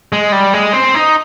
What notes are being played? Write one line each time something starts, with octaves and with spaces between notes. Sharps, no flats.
G#3
G3
G#3
C4
D#4